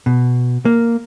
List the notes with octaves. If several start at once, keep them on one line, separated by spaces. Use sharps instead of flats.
B2
A#3